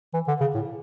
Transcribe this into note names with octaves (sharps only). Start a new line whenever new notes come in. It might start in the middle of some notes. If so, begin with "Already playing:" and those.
E3
D3
C#3
A2